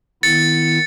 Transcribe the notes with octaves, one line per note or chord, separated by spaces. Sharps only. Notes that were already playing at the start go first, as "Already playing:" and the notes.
D#3 B3 E4 A6 C#7